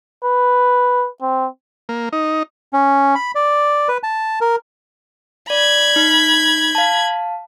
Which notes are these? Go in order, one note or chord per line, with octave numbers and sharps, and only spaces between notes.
B4
C4
A#3
D#4
C#4
B5
D5
B4
A5
A#4
D5 B5 G#6
D#4
F5 A5